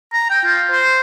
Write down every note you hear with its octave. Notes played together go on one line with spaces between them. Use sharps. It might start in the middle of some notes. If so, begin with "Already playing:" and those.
A#5
G5
F4
C5